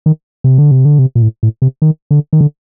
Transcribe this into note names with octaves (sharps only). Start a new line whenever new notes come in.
D#3
C3
D3
C3
D3
C3
A#2
A2
A2
C3
D#3
D3
D#3
D3